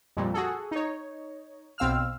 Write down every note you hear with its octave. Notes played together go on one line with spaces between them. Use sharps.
F2 A#2 G3
F#4 G#4 A4
D#4 C#5
B1 C4 F5 E6 F6